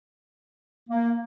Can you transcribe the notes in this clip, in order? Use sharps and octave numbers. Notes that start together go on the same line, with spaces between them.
A#3